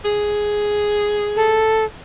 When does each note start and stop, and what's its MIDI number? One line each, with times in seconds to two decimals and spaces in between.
0.05 1.64 68
1.36 1.84 69